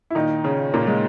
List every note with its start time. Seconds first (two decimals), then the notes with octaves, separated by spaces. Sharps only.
0.10 E4
0.15 A#2 D#3 D#4
0.44 C#3 C#4
0.74 A#2 A#3
0.87 G#3